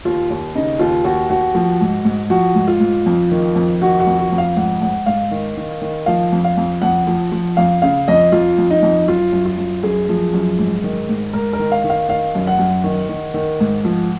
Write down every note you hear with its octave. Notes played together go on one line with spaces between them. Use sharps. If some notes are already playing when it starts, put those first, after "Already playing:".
D#2 F4
D#2
C#3 D#4
D#2 F4
D#2 F#4
D#2 F#4
F3
G#2
G#2
F3 F#4
G#2
F4
G#2
F2
D#3
F2
D#3 F#4
F#4
F2
F#4
F2
F5
G#2 F#5
G#2 F#5
G#2 F5
D#3
D#3
D#3
F3 F5
F2
F5
F2
F2 F#5
F3
F3
F2 F5
C#3 F5
F2 D#5
F2 F4
F2
D#4
F2
F#2 F4
F#2
F4
F#2
F#2 G#4
F3
F#2
G#2
D#3
G#2
G#2 A#4
A#4
D#3
F5
D#3
F5
D#3 F5
F#2
F#5
F#2
D#3
D#3
D#3
G#2
F3